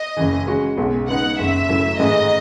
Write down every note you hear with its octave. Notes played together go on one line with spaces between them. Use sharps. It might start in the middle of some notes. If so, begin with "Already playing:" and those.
Already playing: D#5
F#1 F#2 C#3 E3
C#3 G#3 C#4 F#4
B1 B2 G#3
C#3 G#3 B3 D#4 G#4 F#5
F#1 F#2 C#3 E5
F#2 C#3 F#3 A3 E4
A1 G#2 E3 G#3 D#5